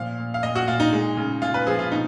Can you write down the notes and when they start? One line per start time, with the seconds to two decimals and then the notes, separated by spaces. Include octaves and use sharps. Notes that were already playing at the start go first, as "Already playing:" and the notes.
Already playing: A#2 F3 F5
0.18 A#2
0.34 F5
0.43 A#2 D#5
0.55 F#4
0.67 A#2 F4
0.80 D#4
0.93 G#3
1.17 C#3
1.42 C#3 F4
1.54 B4
1.67 F3 G#4
1.79 F4
1.92 B2 D#4